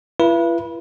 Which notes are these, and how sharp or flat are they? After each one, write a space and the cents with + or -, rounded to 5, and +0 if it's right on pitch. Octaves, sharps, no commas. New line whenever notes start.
E4 +45 B4 -25